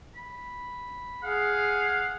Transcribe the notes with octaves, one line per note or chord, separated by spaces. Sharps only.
B5
G#4 F5 F#5